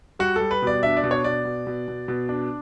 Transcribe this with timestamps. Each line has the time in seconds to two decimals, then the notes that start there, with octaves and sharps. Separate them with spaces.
0.19 G3 F#4
0.36 G3 A4
0.51 B4
0.62 B2 D5
0.83 D4 E5
0.97 D5
1.03 B2
1.11 C#5
1.24 B2 D5
1.45 B2
1.67 B2
1.88 B2
2.08 B2
2.29 D4